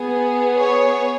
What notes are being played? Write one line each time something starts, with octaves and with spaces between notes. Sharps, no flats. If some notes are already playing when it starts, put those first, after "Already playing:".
Already playing: B3 G#4
C#5